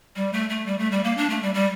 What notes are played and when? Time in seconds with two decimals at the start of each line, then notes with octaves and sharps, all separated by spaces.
0.16 G3
0.33 A3
0.50 A3
0.66 G3
0.79 A3
0.91 G3
1.04 A#3
1.17 D4
1.30 A3
1.42 G3
1.54 G3